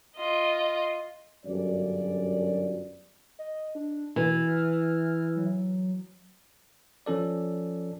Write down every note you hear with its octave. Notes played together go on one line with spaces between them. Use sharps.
F4 D#5
G1 F#2 D5
D#5
D4
B2 E3
F6
F#3
F3 C#4 A4 D5